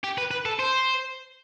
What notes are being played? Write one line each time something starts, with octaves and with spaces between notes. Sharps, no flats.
G4
B4
B4
A4
C5